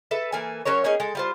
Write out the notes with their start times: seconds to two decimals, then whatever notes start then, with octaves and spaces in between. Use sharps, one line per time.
0.11 A4 B4 E5
0.32 E3 A#3 A4 G#5
0.65 F#3 C#4 A#4 C#5
0.84 A#3 C#4 D#4 G#4
1.00 G#3 A4
1.15 G3 F4 C5